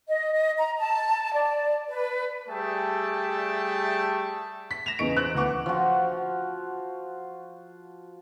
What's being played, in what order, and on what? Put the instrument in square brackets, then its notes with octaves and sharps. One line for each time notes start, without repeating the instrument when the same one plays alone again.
[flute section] D#5
D#5
A#5
A5
D5
B4
[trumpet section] G3 A3 G#4 E5 G5 A5
[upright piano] B6
A#6 E7 F7
E2 C#3 E3 D#4 C#6 D7
C5 F#6
D2 E3 B4 F#5 C#6 D6
[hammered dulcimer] F3 F#4